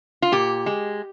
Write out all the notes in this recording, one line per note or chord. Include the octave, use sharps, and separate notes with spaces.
F4
A#2 G4
G#3